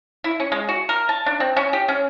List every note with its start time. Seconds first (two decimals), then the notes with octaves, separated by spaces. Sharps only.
0.24 E4
0.40 C#4
0.52 G#3
0.69 F#4
0.89 A#4
1.09 A5
1.26 D4
1.40 C4
1.57 C#4
1.73 G4
1.88 C#4